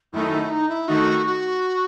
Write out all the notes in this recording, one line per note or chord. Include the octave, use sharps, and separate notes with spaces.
F#2 D#3 A3 D#4 E4
D#4
E4
D#3 A3 D#4 F#4
F#4